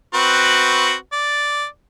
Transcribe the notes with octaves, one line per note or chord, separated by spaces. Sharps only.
C4 F#4 B4
D5